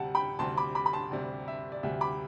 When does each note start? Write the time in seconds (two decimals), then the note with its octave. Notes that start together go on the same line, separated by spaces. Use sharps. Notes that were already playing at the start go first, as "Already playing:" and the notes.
Already playing: D2 C3 G3 F#5 A5
0.15 G5 B5
0.39 D2 C3 G3 A5 C6
0.57 B5 D6
0.75 B5 D6
0.86 B5
0.93 A5 C6
1.11 D2 C3 G3 D5
1.48 E5
1.72 D5
1.83 D2 C3 G3 E5
2.01 B5 D6